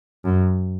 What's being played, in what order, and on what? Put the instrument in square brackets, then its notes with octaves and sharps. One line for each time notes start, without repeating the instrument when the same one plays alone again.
[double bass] F#2